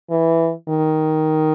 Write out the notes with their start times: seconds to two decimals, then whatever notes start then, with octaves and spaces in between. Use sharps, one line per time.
0.10 E3
0.69 D#3